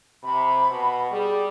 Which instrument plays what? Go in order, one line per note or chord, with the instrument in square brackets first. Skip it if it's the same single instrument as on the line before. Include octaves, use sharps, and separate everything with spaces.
[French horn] C3 [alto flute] B5
[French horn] B2
[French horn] G3 [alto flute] G#4